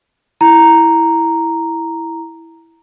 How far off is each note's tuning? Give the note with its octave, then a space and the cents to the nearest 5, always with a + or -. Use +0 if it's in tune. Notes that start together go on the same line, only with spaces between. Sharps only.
E4 +0 A#5 +0